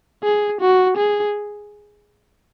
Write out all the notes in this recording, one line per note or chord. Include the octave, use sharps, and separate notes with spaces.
G#4
F#4
G#4